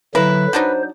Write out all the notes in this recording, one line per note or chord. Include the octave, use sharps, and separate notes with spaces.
D3 F#3 A#3 E4 B4
F#3 D4 D#4 C5